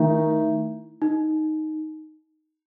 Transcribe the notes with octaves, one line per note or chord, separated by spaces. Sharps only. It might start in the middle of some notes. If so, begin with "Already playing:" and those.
Already playing: D#3 A3 D#4 E4
D#4